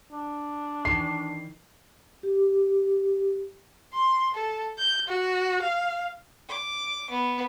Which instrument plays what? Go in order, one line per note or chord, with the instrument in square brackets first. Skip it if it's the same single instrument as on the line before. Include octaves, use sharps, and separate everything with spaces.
[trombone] D4
[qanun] D#3 E3 [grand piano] C7
[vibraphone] G4
[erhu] C6
A4
G6
F#4
F5
[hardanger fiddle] D6
B3